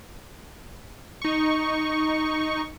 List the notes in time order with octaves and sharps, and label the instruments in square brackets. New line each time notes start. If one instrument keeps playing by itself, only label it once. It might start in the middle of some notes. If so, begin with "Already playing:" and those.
[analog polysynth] D#4 C#6